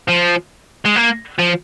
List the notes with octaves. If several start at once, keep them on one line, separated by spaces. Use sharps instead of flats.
F3
G#3
A#3
F3